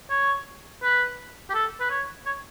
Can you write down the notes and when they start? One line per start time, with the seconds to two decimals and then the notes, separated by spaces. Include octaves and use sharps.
0.10 C#5
0.83 B4
1.50 G4
1.54 A4
1.80 B4
1.90 C#5
2.26 C#5